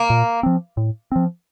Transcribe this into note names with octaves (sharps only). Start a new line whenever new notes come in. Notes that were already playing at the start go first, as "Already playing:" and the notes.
Already playing: A#3
A#2
F3 C4
A2
F3 C4